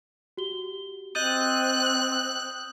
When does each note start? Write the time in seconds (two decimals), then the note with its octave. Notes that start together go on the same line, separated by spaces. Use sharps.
0.37 F#4 G4 G7
1.15 C4 D#5 D#6 F#6 G6 A6 D#7 G7